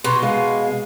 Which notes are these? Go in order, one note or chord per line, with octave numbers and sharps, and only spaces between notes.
B2 B3 C6
G#3 F5